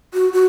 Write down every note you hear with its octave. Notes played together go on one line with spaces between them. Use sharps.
F#4
F#4